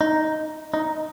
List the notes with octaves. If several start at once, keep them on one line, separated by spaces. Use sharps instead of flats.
D#4
D#4